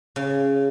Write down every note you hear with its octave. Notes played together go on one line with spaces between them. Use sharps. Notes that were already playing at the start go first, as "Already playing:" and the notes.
C#3